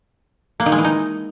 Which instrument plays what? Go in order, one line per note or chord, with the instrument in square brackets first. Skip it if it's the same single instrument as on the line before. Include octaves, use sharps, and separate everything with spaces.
[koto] A#3
D#3
G#3
E3
D#4